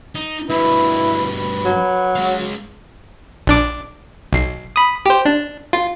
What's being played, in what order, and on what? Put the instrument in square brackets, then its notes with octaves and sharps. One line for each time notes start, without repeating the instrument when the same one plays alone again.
[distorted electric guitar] D#4
[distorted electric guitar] G2 B2 [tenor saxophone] E4 [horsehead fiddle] B4
[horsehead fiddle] B4
[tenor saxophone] F#3
[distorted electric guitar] G#3 F5
[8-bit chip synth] A#1 D4 D6
B1 C7
B5 D#6
G4 C5
D4
F4